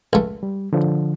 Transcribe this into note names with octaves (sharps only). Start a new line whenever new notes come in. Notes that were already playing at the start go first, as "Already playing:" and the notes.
C#2 A3
G3
D3 F3